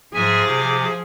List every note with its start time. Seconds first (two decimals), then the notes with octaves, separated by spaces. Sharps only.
0.14 G#2 F3 G#4 E5 G#5
0.46 C3 D6